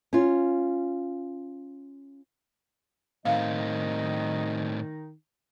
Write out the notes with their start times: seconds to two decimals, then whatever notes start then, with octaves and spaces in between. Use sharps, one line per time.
0.13 C#4 F4
3.25 A2 D#3 C4 D#4 D#5 F5